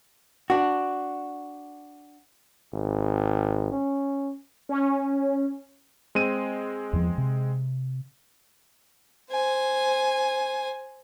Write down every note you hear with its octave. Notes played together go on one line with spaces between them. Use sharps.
D4 F#4
G#1
C#4
C#4
G#3 C4 D#7
E2 F3
C3
C5 G#5